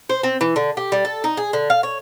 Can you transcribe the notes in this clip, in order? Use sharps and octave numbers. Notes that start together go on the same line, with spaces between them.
C5
C4
E3
D3
G4
G3
A4
D#4
G#4
D3
F5
C#5